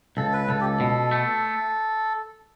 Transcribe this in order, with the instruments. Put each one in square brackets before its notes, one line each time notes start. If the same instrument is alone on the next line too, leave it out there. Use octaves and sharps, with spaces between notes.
[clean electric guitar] C#2 [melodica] A4
[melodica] B4
[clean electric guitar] C#2 [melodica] A4
[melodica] G4
A4
[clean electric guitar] B2
A3